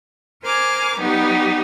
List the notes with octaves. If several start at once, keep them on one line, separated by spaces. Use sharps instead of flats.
A#4 C5 G#5 D6 F6
F#3 G3 B3 D#4 G4